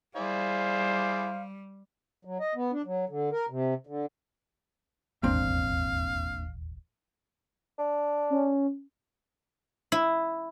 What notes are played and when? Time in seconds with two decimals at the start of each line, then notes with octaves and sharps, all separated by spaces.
0.16 G3 E4 G#4 C5 D5 F5
2.25 F#3
2.40 D#5
2.55 B3
2.72 D4
2.86 F#3
3.09 D3
3.32 A#4
3.50 C3
3.87 D3
5.23 D#1 G#1 E2 A#3 C4 D4 F5
7.78 D4
8.30 C#4
9.92 E4